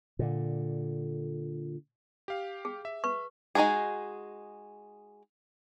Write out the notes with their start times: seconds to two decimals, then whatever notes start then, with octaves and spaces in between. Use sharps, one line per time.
0.19 A#2 D3
2.28 G4 F5
2.65 G#4
2.85 E5
3.04 B4 C#6
3.55 G#3 D#4 E4 F#4 G#4